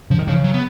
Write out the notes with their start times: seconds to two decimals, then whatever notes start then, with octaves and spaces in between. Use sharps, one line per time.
0.10 C#3 F3
0.19 D#3
0.27 C#3 F3
0.44 F#3
0.54 B3